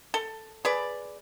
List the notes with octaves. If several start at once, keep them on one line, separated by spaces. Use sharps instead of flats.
A4
G#4 B4 D5